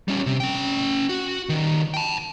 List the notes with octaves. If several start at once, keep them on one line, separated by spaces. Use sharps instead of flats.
G3 C#4
C3
C#4 G5
F#4
D#3 G3
G5 A5